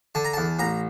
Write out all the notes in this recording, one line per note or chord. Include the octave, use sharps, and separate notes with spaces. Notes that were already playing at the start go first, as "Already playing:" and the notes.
D3 A5
A#5
E2 A5
A1 A#5